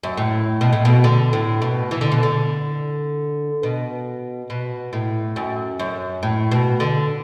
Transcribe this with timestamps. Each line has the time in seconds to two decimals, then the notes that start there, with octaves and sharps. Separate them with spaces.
0.03 F#2
0.17 A2
0.61 B2
0.73 A2
0.85 B2
1.04 D3
1.33 A2
1.62 B2
1.91 E3
2.01 D3
2.12 B2
2.23 D3
3.63 B2
4.50 B2
4.93 A2
5.36 F#2
5.79 F#2
6.23 A2
6.51 B2
6.80 D3